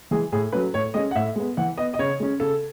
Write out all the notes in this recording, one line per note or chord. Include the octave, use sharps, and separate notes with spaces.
E3 G#3 G#4
A2 G#4
F#3 A3 C#4 B4
A2 C#5
G#3 C#4 D#5
F#5
A2 E5
G#3 B3
E3 F#5
B3 D#5
D#5
C#3 C#5
G#3 C#4
C#3 A4